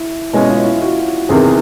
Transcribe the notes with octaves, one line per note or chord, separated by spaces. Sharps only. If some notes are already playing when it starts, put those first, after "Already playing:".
Already playing: E4
B2 G#3 C#4 E4
F4
E4
F#4
E2 C3 D#3 G#4